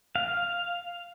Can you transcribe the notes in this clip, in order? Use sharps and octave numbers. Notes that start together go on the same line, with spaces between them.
F5